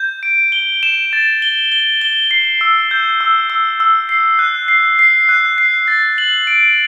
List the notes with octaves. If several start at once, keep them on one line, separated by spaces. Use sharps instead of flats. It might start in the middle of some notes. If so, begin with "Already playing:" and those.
Already playing: G6
D7
G7
E7
A6
G7
G7
G7
C7
E6
G6
E6
E6
E6
C7
F#6
C7
C7
F#6
C7
A6
F#7
D7